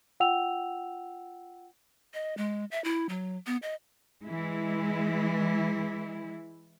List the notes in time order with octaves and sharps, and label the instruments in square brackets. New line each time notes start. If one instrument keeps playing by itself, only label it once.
[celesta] F4 F#5 G5 E6 F7
[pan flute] D#5
G#3
E5
E4
F#3
B3
D#5
[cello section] E3 G#3 E4